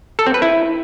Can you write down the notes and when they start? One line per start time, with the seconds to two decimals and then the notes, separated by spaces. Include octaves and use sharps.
0.19 A4
0.26 C4
0.34 B4
0.42 E4